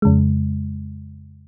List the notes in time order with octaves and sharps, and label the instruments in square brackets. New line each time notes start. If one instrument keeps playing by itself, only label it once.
[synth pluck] F2 C#3 G#3